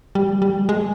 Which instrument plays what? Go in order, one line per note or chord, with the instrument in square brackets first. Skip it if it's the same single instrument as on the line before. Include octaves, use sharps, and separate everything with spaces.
[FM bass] G3
G3
G#3